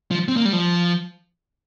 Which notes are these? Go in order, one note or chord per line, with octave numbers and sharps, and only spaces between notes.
F3
C4
A#3
G3
F3